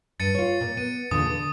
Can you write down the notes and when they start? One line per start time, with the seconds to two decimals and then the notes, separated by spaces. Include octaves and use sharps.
0.20 G2 A6 C#7 D#7
0.35 F4 C#5
0.61 A#2
0.77 B3 D#7
1.11 E2 A#2 D3 D#6
1.25 D3